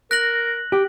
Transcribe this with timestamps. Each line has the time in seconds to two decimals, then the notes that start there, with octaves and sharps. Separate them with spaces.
0.11 A#4 F#6 A#6 F#7
0.72 G4